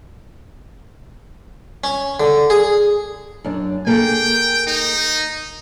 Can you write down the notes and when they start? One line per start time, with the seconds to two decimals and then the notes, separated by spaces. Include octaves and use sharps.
1.84 C#4
2.20 D3
2.50 G#4
3.44 F#2 D4
3.87 A#3 G#4 A4 G5
4.67 D#4